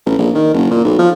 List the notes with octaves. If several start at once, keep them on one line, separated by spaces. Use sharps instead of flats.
A1
A#1
D#3
F#1
A#2
B1
F3